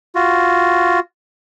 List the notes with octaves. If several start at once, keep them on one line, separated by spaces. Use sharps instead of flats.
F4 F#4